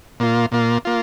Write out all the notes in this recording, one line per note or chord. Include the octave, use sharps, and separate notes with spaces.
A#2 A#3 F4
A#2 A#3 F4
A#3 F4